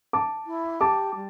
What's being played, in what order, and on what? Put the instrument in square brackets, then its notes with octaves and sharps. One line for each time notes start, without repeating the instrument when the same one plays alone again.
[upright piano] A5 D6
[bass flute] E4
[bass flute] G4 [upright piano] A5 D6
[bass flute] G3